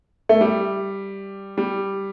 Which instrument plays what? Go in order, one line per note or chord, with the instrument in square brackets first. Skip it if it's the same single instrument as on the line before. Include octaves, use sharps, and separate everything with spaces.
[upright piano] A3
G3
G3